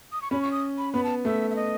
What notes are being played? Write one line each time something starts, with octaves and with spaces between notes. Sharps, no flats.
D#6
C#6
C#4 B5
C#6
D#6
B5
B3 B5
A5
A3 E5
E5
D#5